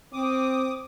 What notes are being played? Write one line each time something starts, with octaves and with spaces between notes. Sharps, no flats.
C4 D6 D#6